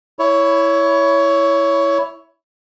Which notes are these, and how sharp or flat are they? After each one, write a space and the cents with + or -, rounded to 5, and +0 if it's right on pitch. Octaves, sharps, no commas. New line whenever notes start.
E4 +0 C#5 +15